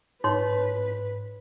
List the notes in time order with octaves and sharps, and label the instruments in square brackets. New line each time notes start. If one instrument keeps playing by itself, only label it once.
[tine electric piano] G#2 [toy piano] D#4 C#5 C6 [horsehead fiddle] B4